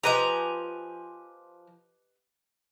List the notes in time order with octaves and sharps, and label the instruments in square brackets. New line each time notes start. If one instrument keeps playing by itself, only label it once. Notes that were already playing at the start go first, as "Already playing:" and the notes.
[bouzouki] F3 G#5 A#5 [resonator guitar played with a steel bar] G4 B4 D#5